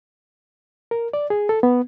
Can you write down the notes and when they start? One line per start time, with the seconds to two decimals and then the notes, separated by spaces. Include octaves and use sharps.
0.91 A#4
1.13 D5
1.30 G#4
1.49 A4
1.63 B3